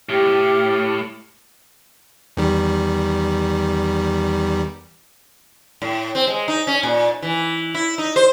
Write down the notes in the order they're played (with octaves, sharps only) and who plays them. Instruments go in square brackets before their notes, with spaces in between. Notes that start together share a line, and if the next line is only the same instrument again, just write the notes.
[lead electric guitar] A2 [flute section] G4 F6
[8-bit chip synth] E2 D#3 G3
[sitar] A2
C4
G#3
D#4
C#4
A#2
E3
E4
D#4
C5